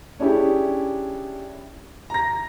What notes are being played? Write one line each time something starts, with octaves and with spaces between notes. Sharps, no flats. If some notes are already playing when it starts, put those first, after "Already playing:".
C#4 D4 E4 G4 G#4
A#5 A#6